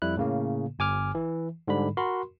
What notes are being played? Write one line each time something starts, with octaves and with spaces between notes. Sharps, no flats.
F2 G3 E4 F#6
A2 C#3 A#3
G1 G#5 D6 F6
E3
G#2 D3 G3 B5
F#4 A#4 B5 C6